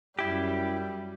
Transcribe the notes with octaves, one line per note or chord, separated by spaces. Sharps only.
F#2 G3 E4 G4